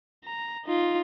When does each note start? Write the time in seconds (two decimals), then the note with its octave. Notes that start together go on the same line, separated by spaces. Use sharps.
0.25 A#5
0.65 D#4 F4